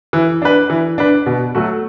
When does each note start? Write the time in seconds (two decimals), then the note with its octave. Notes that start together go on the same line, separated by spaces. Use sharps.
0.13 E3
0.42 D4 B4
0.70 E3
0.98 D4 B4
1.26 B2
1.55 F#3 A3 F#4